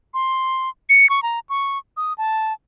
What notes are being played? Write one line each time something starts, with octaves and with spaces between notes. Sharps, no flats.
C6
C#7
C#6
A#5
C#6
D#6
A5